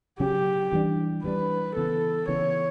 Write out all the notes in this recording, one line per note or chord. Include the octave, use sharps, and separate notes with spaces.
C#3 F#3 C#4 G4
E3 G3 B3 D4
E3 G3 B3 D4 B4
C#3 E3 B3 A4
C#3 E3 B3 C#5